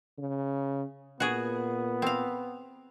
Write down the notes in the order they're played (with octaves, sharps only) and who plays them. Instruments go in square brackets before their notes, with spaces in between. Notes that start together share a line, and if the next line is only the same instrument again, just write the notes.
[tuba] C#3
[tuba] A#2 [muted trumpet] B3 [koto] F#4 G#4
[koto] C4 F5